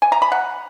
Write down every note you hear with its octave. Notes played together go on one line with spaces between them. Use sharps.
G#5
A#5
B5
F#5